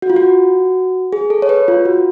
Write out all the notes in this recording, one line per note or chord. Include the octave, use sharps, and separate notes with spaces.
F#4
F4
F#4
G#4
A4
C#5
B4
F4
F#4